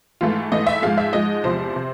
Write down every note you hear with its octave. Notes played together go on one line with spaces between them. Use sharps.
G#2 E3 A3 F4
G#2 E3 A3 D#5
E5
G#2 F3 G#3 F5
E5
G#2 F3 G#3 D#5
E2 C3 F3 C5
C3